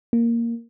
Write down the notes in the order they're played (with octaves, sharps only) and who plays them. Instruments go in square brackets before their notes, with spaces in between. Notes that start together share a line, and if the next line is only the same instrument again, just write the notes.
[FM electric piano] A#3